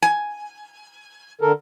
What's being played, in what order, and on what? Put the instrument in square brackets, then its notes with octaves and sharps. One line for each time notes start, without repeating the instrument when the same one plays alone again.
[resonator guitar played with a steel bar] G#5
[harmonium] D3 A4 A#4